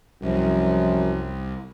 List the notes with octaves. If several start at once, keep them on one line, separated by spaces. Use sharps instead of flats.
C2 F#2 F3